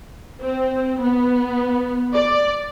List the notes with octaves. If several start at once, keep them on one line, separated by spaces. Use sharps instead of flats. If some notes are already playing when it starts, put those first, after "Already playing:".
C4
B3
D5